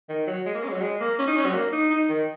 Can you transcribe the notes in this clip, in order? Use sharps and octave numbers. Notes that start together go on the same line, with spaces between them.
D#3
F#3
G#3
A#3
C#4
G#3
F#3
G#3
A#3
C#4
D#4
C#4
F#3
A#3
D#4
D#4
D#3